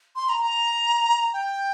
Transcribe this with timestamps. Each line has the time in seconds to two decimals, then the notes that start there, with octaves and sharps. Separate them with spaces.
0.16 C6
0.29 A#5
0.42 A#5
1.33 G5